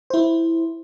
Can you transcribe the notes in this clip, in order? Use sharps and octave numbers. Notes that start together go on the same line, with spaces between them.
E4 C5